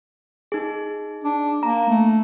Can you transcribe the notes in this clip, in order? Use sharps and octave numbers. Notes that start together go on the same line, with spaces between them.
D#4 G#4
D4
A#3 A#5
A3